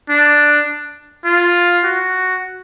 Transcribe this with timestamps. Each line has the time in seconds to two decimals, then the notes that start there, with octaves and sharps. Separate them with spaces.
0.09 D4
1.25 F4
1.84 F#4